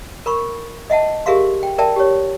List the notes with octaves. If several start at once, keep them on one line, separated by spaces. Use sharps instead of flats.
A#4 B5 C#6
D#5 E5 F#5 A5
G4 G#4 A#4 E5 F5 C6
G5
A#4 D5 E5 G5 A5
G4 C#5